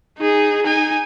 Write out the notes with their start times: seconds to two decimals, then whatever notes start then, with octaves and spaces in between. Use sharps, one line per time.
0.18 D#4 G#4
0.64 D#4 G#5